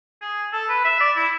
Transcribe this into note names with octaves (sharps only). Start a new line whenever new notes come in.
G#4
A4
B4
E5
D5
E4